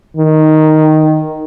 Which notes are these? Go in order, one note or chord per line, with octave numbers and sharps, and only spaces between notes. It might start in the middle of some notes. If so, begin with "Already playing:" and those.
D#3